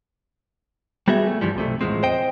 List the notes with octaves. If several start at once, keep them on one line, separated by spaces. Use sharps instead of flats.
G3 B3 F#4 G#4 E5
A3
G2 E3 F3 G3
B1 C3 A3
E2 A2 C3 F3 G#3 C4
C5 D#5 G5